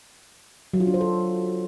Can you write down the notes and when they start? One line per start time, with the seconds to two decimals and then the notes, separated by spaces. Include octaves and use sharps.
0.73 F#3
0.80 F4
0.87 D4
0.94 C5
1.01 A4